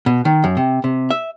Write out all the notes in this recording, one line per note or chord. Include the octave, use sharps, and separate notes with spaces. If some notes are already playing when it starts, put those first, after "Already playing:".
B2
D#3
F#2
C3
C3
E5